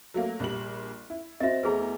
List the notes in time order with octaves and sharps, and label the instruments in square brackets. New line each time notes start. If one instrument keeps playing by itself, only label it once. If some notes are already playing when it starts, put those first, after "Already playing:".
[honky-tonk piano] F#3 A3 A#3
A#1 G3 F#7
E4
[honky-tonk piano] C4 F#4 [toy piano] D#5 E5
[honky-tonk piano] E2 A3 A#5 [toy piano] G#4 B4